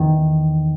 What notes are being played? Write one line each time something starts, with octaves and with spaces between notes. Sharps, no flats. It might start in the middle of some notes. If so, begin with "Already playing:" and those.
Already playing: E2 D#3